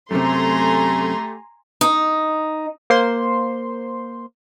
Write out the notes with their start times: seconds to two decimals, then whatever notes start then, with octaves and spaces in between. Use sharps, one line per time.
0.11 F#2 C3 A3 G4 G#5 A#5 C6
1.81 D#4
2.90 A#3 C5 C6